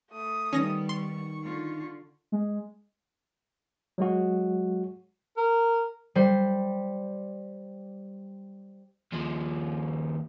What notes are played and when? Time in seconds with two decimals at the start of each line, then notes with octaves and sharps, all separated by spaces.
0.12 A3 D#6
0.53 D#3 G3 B3 C#4 A#6
0.89 C6 C#6
1.43 D3 F4
2.32 G#3
3.98 F#3 G#3 F#4
5.37 A#4
6.15 G3 C5
9.13 D#2 F3